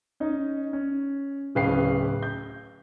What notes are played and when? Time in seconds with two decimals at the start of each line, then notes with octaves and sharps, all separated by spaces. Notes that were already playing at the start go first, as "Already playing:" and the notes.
0.20 C#4 D#4
0.73 C#4
1.55 D1 C#3 B4 F5 G5 C7
2.23 G6